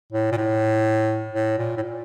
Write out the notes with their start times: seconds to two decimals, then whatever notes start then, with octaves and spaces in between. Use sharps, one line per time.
0.12 A2
0.32 A#2
0.37 A2
1.34 A2
1.58 A#2
1.77 A2
1.83 A#2